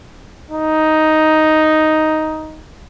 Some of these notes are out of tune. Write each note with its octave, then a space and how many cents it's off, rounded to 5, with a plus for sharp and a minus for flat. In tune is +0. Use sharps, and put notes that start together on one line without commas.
D#4 +5